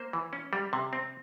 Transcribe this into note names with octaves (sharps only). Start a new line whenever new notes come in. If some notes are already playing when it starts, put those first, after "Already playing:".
Already playing: A#3 C5
E3
C#4
G3
C3
C4